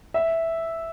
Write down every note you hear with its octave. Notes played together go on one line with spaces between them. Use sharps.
E5